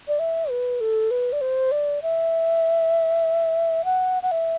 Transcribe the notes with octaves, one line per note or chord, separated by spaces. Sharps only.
D5
E5
B4
A4
B4
D5
C5
D5
E5
F#5
F#5
E5